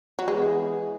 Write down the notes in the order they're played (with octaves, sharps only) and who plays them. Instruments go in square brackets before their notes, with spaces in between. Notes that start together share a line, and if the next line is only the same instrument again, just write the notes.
[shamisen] F#3
[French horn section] E3 B3 G#4 [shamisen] G#3